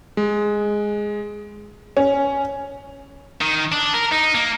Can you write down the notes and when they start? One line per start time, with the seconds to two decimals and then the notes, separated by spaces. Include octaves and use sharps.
0.17 G#3
1.97 C#4
3.41 D#3
3.72 D4
3.94 A#4
4.11 D#4
4.35 A#3